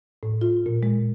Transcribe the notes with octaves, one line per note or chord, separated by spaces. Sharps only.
A2
F4
A#2
G#3